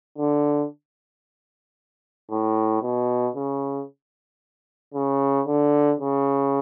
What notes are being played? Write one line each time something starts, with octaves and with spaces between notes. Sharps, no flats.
D3
A2
B2
C#3
C#3
D3
C#3